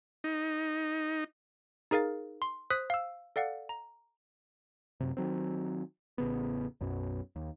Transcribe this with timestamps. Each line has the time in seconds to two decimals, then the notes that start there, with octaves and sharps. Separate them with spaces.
0.24 D#4
1.91 D#4 G#4 A#4 F5 A6
2.42 C6
2.70 C5 D#6 F#6 B6
2.90 F5 E6
3.36 A4 D5 F5 F#5
3.69 A#5
5.00 F#2 C3
5.17 D#3 F#3 C4
6.18 A1 C#3 B3
6.81 B1 F#2 B2
7.36 D#2